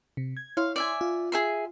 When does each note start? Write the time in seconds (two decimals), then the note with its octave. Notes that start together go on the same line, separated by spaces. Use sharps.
0.17 C3
0.37 G#6
0.57 E4 C#5 F5 C6
0.76 D5 E5 G#5
1.01 F4
1.32 G#4 E5 C6